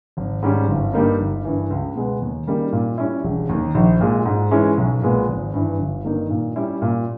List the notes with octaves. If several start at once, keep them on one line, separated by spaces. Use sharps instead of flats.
G#1
G#2 G3 C#4
G1
G2 G3 A#3 D#4
G1
G2 E3
C#2
B2 G#3 B3
D#2
C#3 G3 A#3 D#4
A#2
G3 C#4 E4
E1
D#2 D#3
A#1
A#2 G#3
G#2
E3 G#3 C#4 E4
B1
A#2 G#3 B3
G#1
G2 E3
G1
G2 D#3 A#3 D#4
A#2
G3 C#4 E4
A#2